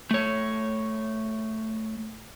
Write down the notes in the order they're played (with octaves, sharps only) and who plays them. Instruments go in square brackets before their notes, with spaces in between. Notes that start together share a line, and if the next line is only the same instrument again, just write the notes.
[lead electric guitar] A3 C#5